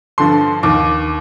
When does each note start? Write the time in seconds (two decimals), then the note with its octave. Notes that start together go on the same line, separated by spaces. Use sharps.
0.18 G2 D3 F3 C6
0.63 D#2 D#3 D6